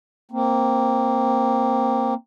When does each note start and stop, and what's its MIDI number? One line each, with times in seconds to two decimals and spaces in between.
0.31 2.14 58
0.31 2.14 60